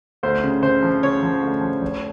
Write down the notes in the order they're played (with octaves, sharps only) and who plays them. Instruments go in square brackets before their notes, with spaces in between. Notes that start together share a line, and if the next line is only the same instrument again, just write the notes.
[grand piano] D2 [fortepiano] C5
[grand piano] C#3
[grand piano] C#3 [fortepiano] C5
[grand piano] F3
[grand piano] C#3 [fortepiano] C#5
[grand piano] F3
D2
F3
F1